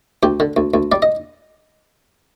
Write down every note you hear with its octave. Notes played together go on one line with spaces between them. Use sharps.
D2 G4
D3
D2
D2
G3 D5
D#5